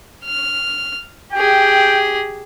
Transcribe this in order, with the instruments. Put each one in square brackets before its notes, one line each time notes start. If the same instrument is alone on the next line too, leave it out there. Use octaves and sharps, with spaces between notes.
[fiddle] F6
[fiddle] G4 G#4 [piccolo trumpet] G5